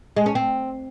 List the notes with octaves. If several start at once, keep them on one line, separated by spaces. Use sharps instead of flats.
G#3
C#4
C4